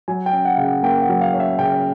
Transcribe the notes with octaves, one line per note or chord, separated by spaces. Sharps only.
F#3 G#5
G5
C#4
F#5
C#3 F5
F#5
A#3 G5
F#5
F#3
F5
C#4
E5
C#3 G5